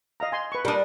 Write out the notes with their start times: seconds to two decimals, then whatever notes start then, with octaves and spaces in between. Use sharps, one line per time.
0.20 D#5 F5 A#5
0.32 G#5 C6
0.52 B4 C#6
0.65 G3 D4 A#4 D#6